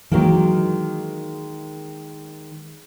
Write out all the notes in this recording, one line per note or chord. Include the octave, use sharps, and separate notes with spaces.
D#3 E3 F#3 G#3 A#3